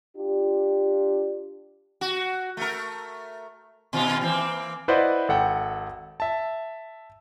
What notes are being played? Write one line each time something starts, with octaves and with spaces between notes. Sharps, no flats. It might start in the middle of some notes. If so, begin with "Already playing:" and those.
D4 F4 G4
F#4
A3 A#4
B2 D#3 F4
E3 A#3 C4
E4 B4 C5 D5 D#5 F#5
G#1 A4 F#5 G5
E5 A5